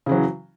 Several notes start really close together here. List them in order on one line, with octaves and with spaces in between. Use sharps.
C#3 E3 F#3